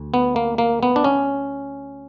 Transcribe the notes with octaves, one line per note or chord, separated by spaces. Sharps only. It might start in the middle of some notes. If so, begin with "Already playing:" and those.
Already playing: D2
B3
A#3
A#3
B3
D4
C#4